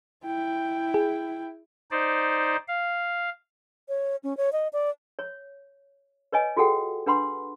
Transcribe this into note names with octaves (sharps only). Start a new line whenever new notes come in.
E4 G5
G#4
D#4 C5 D5
F5
C#5
C#4
C#5
D#5
D5
C#5
B4 C#5 D#5 G#5
F4 F#4 G#4 A4 F#5 G5
D4 B4 F#5 B5 C6